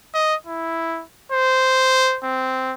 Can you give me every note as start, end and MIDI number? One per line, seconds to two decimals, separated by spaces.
0.14 0.35 75
0.47 1.02 64
1.32 2.18 72
2.24 2.74 60